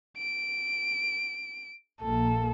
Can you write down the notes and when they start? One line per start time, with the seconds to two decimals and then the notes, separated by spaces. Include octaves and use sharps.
0.17 D7
2.01 A#1 A#3 A4